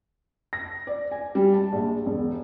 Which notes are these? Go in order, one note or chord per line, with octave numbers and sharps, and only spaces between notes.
A#6
D5
G#5
G3
A5
A#1
E1